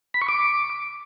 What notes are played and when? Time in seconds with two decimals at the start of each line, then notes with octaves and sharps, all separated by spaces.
0.14 B5
0.21 C#6
0.29 D6